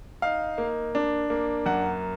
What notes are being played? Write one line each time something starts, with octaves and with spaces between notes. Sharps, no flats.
D#4 F5
A#3
D4
A#3
F#2 F#5